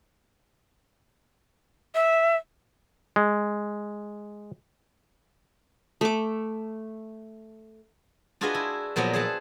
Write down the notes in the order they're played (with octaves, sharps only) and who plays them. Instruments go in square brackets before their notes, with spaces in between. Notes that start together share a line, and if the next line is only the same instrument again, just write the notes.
[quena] E5
[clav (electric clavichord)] G#3
[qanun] A3 D6
[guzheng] D4 F4 F#4 G#4 B4 D#5
E4
A#2 F3 F#3 A#3 B3
G#4 C5 E5 F#5 A5